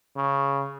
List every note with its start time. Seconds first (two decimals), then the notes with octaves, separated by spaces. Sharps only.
0.16 C#3